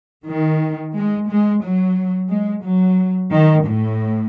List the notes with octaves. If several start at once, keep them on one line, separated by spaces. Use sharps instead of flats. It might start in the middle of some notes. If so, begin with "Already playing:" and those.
D#3
G#3
G#3
F#3
G#3
F#3
D#3
A2